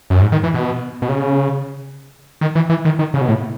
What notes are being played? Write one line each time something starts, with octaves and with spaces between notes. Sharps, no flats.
F#2
G#2
D#3
E3
B2
B2
C#3
D#3
E3
E3
D#3
D#3
C#3
B2
A2